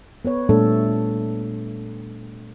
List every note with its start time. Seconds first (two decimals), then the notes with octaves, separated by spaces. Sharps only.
0.25 B3 B4 C#5
0.49 A#2 G3 A3 D4 A4